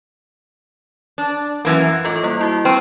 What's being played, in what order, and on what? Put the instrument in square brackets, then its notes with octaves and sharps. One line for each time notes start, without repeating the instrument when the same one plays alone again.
[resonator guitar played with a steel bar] D4
F#2 E3 A#3
[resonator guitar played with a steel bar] A2 [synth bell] F4 A4 D#5
[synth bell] G3 A#3
E4 F#4
[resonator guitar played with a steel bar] C4 [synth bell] C#6 F6 D#7